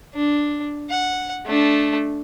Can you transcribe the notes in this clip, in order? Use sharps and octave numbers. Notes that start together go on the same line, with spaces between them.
D4
F#5
A3 D4